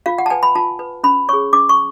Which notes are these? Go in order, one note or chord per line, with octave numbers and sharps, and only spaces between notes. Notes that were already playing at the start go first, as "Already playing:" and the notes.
F4 F5
F#5
A5
B4 G#5
B5
F4 A5
B4
C#4 B5
G#4 C#5 C#6
C#4 D6
C#6